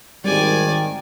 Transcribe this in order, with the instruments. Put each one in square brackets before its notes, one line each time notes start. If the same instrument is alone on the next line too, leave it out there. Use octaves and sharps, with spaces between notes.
[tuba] G#1 [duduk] D#3 [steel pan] G3 [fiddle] D5 G#5